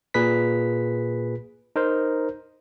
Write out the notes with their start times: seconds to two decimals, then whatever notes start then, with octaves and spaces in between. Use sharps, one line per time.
0.14 A#2 G#4 B4 B6
1.76 D#4 A#4 C5